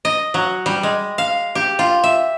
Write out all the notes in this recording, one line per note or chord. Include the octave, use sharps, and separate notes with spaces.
D#5
F#3
G3
G#3
F5
G4
F4
E5